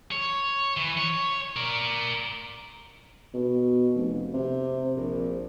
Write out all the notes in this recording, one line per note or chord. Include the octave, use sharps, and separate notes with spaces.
C#5
E3
C#5
A#4 D5
B2
F1
C3
A#1